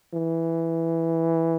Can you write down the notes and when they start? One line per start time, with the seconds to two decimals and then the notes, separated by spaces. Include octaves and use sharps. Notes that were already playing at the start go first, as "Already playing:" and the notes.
0.14 E3